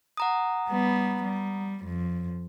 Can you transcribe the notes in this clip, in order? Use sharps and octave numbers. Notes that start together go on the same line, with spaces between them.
F#5 A#5 D#6
G3 B3
G3
F2